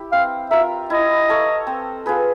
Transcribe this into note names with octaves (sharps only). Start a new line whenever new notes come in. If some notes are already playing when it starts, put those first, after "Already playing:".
Already playing: E4 G4
C4 F5
F4 A#4 E5
E4 D#5
A4 C#5 F5
C4
F4 G#4 B4